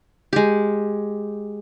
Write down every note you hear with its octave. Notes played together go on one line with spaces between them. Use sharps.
G#3 G4